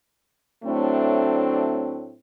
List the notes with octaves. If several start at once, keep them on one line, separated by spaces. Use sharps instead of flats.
A2 F#3 A3 C4 D4